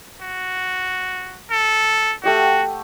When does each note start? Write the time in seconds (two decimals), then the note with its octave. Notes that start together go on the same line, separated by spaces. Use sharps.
0.21 F#4
1.51 A4
2.24 A3 F#4 G4 F#5